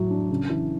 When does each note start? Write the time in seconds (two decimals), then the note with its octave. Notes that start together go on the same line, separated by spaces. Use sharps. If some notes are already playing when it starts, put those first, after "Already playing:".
Already playing: A2 F#3
0.11 D4
0.30 C#3
0.50 E3